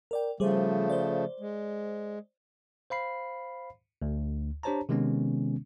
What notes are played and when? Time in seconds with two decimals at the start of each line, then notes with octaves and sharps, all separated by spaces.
0.11 A#4 D5 G5
0.40 C#3 F3 G3 A3 G#4 C5
0.90 C5 D5
1.40 G#3
2.90 C5 F5 B5 C7
4.02 D2
4.63 D4 G4 C5 C#5 A5 A#5
4.89 C3 D#3 G#3 B3 C#4